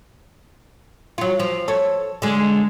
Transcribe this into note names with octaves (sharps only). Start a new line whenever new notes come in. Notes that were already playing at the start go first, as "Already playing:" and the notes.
F#3 F4
F3
A4 C#5
D3 G#3